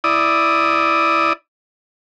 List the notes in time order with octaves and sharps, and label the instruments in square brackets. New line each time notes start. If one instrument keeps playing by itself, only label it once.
[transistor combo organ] E4 D5 D#6